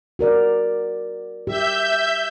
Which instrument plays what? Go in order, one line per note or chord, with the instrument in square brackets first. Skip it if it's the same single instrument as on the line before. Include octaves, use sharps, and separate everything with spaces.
[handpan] F#4 A#4 D5
[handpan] G4 [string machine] E5 G6